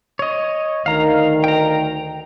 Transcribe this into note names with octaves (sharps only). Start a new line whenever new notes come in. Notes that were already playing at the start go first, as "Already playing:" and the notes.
C#5 D#5
D2 D#3 F5 A#5
G5 A#5